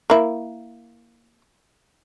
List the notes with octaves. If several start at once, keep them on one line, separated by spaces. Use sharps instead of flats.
A#3 E4